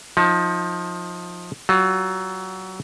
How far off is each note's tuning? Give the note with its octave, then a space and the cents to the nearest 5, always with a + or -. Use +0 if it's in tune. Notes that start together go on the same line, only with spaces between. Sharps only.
F3 +20 D#4 +30 A5 +25
F#3 +25 F4 +35